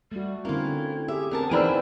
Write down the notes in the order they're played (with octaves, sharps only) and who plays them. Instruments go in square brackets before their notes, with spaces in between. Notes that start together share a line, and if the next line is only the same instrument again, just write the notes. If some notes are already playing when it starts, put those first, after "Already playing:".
[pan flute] G3 [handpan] A3 F#4
[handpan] D3 C4 C#4 [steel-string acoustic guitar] A#3 F4 [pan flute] E4
[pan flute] G4 [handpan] G#4 [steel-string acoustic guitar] E5
[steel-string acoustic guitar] E2 A#4 A5 [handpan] B3 C4
[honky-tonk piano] E3 B5 E6 [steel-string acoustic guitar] D4 G#4 A#4 [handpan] D#4 [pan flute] C5